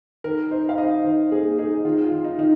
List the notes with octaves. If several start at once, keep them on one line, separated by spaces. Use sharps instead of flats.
D#3 A#4
D#4 C5
F5
D#4 D#5
D#3 C5
A#3 G#4
D#4 G#4
D#3 F4
F4
D#3
D#4
D#3 D#4